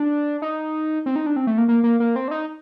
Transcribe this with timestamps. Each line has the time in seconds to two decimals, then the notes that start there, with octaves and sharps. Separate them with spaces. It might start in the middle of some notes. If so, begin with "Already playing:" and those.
Already playing: D4
0.42 D#4
1.06 C4
1.16 D#4
1.26 D4
1.36 C4
1.47 A3
1.58 A#3
1.68 A#3
1.83 A#3
2.00 A#3
2.16 C4
2.28 D4
2.31 D#4